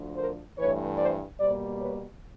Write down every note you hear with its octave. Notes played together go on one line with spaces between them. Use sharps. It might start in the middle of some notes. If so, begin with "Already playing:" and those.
Already playing: D2 D3 F3
A#4 C5
G2 E3 A3 B4 C#5
C5 D5
B2 G3 A#3 C5 D5
B4 C#5